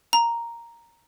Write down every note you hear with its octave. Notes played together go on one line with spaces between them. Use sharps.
A#5